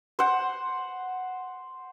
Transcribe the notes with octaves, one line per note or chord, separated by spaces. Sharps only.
C5 F#5